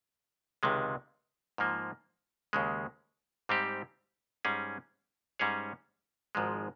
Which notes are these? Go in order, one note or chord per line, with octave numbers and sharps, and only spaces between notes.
C#2 C3 D#3 G#3
G#2 F3 A#3
D#2 C#3 G#3
G#2 G3 C4 G4
G#2 G3 C#4 G#4
G#2 G3 C#4 G#4 C#5
G#1 G#2 F3 G#3